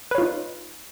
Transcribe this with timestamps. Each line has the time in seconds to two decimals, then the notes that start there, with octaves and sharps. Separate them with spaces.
0.11 B4
0.15 C#5
0.18 F4
0.22 D#4